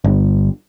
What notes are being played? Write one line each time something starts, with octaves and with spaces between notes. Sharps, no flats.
G1